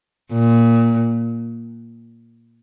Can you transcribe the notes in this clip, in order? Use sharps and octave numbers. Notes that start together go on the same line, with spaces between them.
A#2